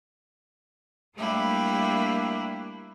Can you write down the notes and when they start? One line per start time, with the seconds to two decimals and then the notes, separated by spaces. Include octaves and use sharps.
1.15 G3 A3 A#3 D4 E4 G4